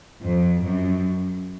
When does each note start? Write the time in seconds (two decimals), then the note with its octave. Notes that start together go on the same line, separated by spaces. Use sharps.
0.24 F2
0.64 F#2